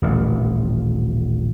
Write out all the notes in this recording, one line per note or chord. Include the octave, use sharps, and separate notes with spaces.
D#1 A1